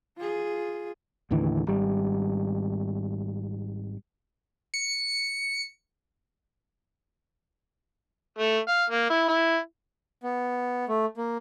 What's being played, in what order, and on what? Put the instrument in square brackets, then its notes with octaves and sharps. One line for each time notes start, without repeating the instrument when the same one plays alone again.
[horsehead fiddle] F4 G#4
[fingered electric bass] D#2 A2 D3 E3
G#1 G3
[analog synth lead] C#7
[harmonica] A3
F5
A#3
E4
E4
[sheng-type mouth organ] B3
A3
A#3